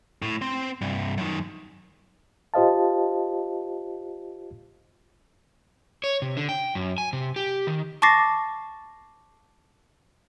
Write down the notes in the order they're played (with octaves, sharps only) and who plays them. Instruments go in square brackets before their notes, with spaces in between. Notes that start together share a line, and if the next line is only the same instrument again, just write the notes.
[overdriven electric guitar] A2
C4 C5
C2 G2
F#2 D#3
[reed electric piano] F4 G4 C5 D#5 F5 A5
[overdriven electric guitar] C#5
C3
D3
G5
F#2
G#5
C3
G4
D#3
[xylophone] A5 C#6 D6 A6 A#6 C7